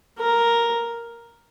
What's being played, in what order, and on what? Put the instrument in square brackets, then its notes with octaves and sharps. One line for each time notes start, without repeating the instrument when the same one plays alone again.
[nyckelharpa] A#4